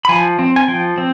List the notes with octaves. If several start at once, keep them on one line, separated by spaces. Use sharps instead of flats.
B5
F3 G#5
C4
G#5
F3 G5
C4